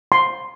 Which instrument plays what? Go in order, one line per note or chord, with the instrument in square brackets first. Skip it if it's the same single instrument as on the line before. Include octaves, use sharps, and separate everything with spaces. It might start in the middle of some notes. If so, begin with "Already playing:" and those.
[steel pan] C6